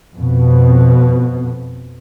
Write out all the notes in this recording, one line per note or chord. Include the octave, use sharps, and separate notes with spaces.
F2 B2